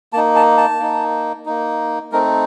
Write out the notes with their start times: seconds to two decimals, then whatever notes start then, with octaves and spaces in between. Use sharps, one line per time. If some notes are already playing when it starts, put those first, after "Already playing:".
0.13 A#3 D#4 A5
0.36 A5
0.57 A5
0.79 A#3 D#4
1.46 A#3 D#4
2.12 A3 C4 D#4 A#4